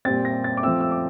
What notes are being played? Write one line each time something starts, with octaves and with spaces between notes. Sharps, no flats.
A#2 G3 C4 A6
A#6
A6
D6
F3 A3 C4 E6
E6
D6